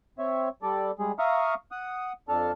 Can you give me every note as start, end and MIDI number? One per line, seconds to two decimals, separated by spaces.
0.18 0.49 60
0.18 0.49 73
0.18 0.49 76
0.62 0.91 55
0.62 0.91 69
0.62 0.91 74
0.99 1.12 55
0.99 1.12 56
0.99 1.12 68
1.19 1.54 76
1.19 1.54 77
1.19 1.54 82
1.19 1.54 85
1.19 1.54 87
1.19 1.54 89
1.72 2.12 78
1.72 2.12 87
2.29 2.52 41
2.29 2.52 62
2.29 2.52 69
2.29 2.52 81
2.29 2.52 89